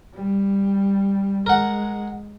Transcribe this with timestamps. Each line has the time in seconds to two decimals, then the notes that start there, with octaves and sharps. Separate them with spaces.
0.15 G3
1.46 G#3 A#4 F#5